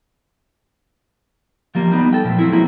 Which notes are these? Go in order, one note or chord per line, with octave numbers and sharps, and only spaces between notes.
F3 G3 A#3
G3 B3 D#4
A4 G5
A#2 F3 A3
F#3 A3 C4 E4
F3 F#3 G#3 A#3 E4